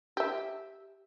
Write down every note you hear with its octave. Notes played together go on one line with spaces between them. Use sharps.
G4 E5